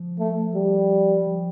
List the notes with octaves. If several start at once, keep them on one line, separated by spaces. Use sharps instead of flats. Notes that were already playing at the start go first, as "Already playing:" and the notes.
Already playing: F3
A3
G3
F3